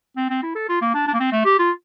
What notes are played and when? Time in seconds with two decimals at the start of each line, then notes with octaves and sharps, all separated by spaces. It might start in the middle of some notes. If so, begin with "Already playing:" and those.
0.17 C4
0.30 C4
0.43 E4
0.55 A4
0.69 F4
0.81 A#3
0.94 D4
1.08 D4
1.14 A#3
1.20 C4
1.32 A3
1.45 G4
1.59 F4